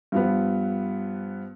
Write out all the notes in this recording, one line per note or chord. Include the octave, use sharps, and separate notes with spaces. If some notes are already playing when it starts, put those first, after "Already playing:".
G2 F3 B3